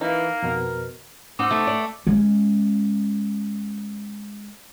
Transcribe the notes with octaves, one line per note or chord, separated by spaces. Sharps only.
E3 A#3 D#4
F2 B2 A#4
C4 D#4 F#5 D6 E6
A3
D5
G#3 C#4